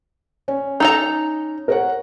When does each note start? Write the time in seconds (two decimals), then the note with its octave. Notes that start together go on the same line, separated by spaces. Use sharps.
0.48 C#4
0.80 D#4 A4 A#5
1.68 A#4 C#5 F#5